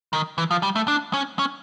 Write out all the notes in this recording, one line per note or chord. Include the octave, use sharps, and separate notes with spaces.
D#3
E3
F3
G3
A3
D4
C#4
C#4